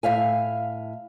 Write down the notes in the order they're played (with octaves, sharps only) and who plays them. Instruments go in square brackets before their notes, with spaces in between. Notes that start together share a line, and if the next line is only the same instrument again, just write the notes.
[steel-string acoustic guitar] A2 E5 F5 G#5